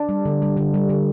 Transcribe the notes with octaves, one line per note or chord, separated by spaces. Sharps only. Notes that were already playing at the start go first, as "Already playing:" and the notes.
Already playing: D4
G3
D3
G3
D3
G3
D3